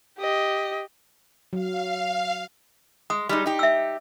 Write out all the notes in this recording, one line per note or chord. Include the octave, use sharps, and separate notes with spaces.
G4 D#5
F#3 F5
G#3 D#6
G3 G#3 D#4
D#4 G4
E5 E6